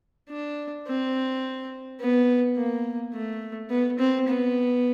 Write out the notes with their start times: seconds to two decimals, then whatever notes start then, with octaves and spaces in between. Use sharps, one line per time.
0.29 D4
0.87 C4
2.00 B3
2.57 A#3
3.14 A3
3.70 B3
3.99 C4
4.28 B3